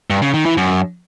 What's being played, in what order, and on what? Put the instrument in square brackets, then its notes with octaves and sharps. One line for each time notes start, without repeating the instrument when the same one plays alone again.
[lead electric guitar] G2
C#3
D#3
E3
F#2